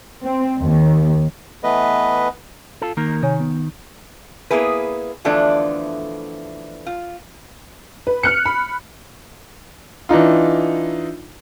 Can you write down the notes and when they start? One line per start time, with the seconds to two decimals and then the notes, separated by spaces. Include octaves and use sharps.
0.24 C4
0.61 D#2
1.63 E3 A3 B3 B4 D#5
2.82 F4 A4
2.97 D#3 A#3 A#4
3.23 C3 D#3 C#5 G#5
3.40 B3
4.51 A#3 B3 E4 G#4 B4
5.25 D3 E3 F3 A3 B3 D4
6.87 F4
8.07 B4
8.23 F6 F#6 C#7
8.46 B5
10.09 E3 D4 D#4 F4